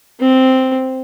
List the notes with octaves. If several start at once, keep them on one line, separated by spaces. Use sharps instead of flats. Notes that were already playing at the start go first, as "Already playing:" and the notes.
C4